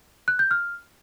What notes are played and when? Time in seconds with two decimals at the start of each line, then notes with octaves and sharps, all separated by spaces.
0.28 F#6
0.39 G6
0.51 F6